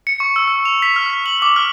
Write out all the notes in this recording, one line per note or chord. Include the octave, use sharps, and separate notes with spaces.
C#7
C#6
E6
E6
F7
B6
F6
B6
F#7
D6
F6